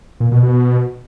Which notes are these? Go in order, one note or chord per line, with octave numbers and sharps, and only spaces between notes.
A#2
B2
B2